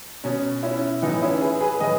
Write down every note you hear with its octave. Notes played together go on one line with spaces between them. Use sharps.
B2 C#4
C#4 E4
A2 E3 B3 D#4
C#4 E4
G#4 B4
G#4 B4
A2 E3 B4 D#5